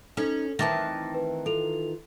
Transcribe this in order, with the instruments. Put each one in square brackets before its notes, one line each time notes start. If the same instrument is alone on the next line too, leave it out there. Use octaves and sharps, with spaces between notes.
[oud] C#4 [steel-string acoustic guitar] D#4 [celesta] A4
[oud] D#3 E3 [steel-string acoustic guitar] A3 C4 A5 [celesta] D6 A6 A#6
[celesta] B4
[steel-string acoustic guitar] F4 [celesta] A4 F7